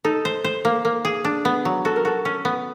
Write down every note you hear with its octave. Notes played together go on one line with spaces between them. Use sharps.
D#4 A4
C5
C5
A#3
A#3
G#4
D4
B3
F#3
F#4 A4
A#4
F#4 A4
C#4
B3